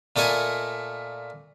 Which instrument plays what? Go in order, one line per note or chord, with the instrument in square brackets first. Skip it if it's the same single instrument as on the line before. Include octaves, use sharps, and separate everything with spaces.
[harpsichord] A#2 A3 A4 A#4 D#5 G#5